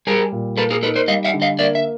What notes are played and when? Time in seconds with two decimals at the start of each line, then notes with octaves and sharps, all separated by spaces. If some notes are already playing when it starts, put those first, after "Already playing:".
0.07 G3 G#4 A#4
0.32 A#2
0.57 A#3 A4 B4
0.70 G#4 A#4
0.83 D#4 A4 B4
0.95 A#4 C5
1.08 G3 D#5 F5
1.25 E5 F#5
1.34 D3
1.42 D#5 F5
1.59 A#3 D5 E5
1.75 E5